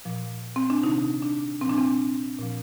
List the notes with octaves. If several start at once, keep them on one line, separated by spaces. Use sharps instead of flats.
A#2 F3
C4
D4
C3 D#3 D#4
D4
A#2 F3 C4 D4
C4
A#2 F3